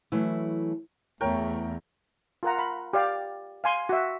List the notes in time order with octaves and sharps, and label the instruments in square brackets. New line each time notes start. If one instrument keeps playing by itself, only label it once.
[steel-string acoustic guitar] E3 F#3 A3 E4
[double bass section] E2 [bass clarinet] A3 [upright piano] A#4 C#5 G5
[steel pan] F4 A#4 F#5 A#5
B5
G4 D5 F5
F5 G#5 C6
F#4 E5